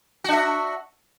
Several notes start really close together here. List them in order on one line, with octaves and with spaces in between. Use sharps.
F#4 D4 E5